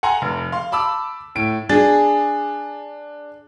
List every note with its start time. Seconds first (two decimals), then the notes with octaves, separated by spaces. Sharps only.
0.03 F#5 G#5 A#5 C6
0.22 F1
0.52 F5 C6
0.72 A5 B5 D6 E6
1.35 A2 D7
1.69 D4 G#4 A6